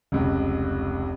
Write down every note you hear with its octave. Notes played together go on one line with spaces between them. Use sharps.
F1 C#2